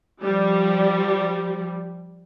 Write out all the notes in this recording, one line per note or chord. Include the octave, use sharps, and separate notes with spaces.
F3 G3